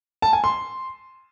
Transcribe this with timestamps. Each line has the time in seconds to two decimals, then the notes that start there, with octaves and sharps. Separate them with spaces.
0.22 A5
0.33 G#5
0.44 C6